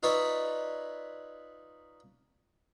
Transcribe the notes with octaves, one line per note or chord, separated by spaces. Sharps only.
D#4 F4 B4 C#5 D5 E5